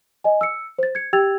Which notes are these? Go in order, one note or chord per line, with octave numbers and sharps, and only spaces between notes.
D#5 G#5
E6 C#7
C5 A6
G#6 C#7
G4 G5 E6 G#6 A6 F7